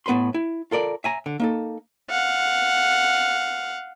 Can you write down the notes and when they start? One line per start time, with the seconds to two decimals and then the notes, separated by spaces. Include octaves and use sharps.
0.06 A2 B3 B4 B5 C6
0.34 E4
0.71 F4 A4 A#4 D5
1.04 E5 G#5 A#5
1.26 D3
1.40 A#3 D#4 A4
2.10 F5 F#5